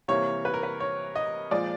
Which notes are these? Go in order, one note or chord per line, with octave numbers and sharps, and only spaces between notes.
C3 E3 G3 A#3 C#5
B4
A#4
B4
C#5
D#5
A#2 F3 G#3 D5